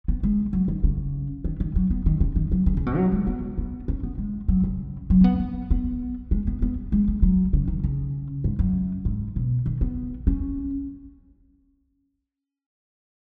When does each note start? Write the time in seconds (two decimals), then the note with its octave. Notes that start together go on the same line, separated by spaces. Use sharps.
0.08 B3
0.23 G#3
0.53 F#3
0.68 D#3
0.83 C#3
1.44 D#3
1.60 D#3
1.76 F#3
1.91 B3
2.06 D#3
2.20 C#3
2.36 D#3
2.52 F#3
2.66 C#3
2.77 C#3
2.86 B2
2.97 F#3
3.12 G#3
3.27 B3
3.58 B3
3.88 C#4
4.03 B3
4.18 G#3
4.48 F#3
4.64 C#3
5.10 F#3
5.20 C#4
5.24 B3
5.40 B3
5.71 B3
6.31 G#3
6.47 B3
6.62 B3
6.92 G#3
7.08 G#3
7.22 F#3
7.53 C#3
7.68 D#3
7.84 C#3
8.44 G#2
8.59 F#2
9.05 G#2
9.36 B2
9.66 D#3
9.81 B3
10.27 C#4